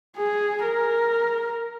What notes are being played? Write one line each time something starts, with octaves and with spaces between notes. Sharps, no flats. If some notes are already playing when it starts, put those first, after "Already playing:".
G#4
A#4